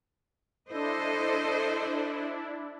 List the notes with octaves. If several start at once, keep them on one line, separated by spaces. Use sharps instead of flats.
D4 E4 A4 C5 D#5